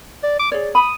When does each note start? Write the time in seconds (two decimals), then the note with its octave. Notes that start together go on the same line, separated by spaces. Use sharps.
0.23 D5
0.39 D6
0.52 G#4 C#5 D5
0.75 B5 D#6